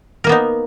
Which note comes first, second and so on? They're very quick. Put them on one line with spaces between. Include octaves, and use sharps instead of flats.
A#4 A#3 B3 D#4